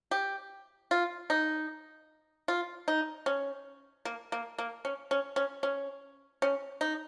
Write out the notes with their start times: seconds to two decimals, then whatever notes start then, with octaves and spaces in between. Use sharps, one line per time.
0.11 G4
0.91 F4
1.30 D#4
2.48 F4
2.88 D#4
3.26 C#4
4.05 A#3
4.32 A#3
4.58 A#3
4.85 C#4
5.11 C#4
5.36 C#4
5.63 C#4
6.42 C#4
6.81 D#4